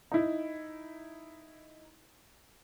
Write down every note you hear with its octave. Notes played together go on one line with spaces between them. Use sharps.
D#4 E4